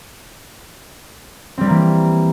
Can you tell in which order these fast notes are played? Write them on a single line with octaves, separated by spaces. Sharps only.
C4 G3 G4 A#3 E3